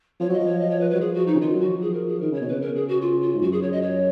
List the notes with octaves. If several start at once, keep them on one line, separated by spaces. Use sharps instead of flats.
F3 C#5
F#3 D#5
F3
C#5
D#5
C#5
B4
B4
F#3
F3 G#4
F#4
D#4
C#3
D#3 F4
F#3
F#4
F3
G#4
A#4
G#4
D#3 A#4
C#3 C#5
B2
C#3 B4
A#4
G#4
F#4
F4
F4
G#2
F#2 F#4
G#4
C#5
D#5
C#5